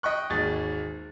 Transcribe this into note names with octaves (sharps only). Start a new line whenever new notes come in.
D#5 G5 C#6 F#6
G#1 D#2 G#4 A6